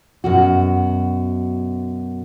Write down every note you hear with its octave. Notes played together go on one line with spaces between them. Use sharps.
F#2 B2 F#4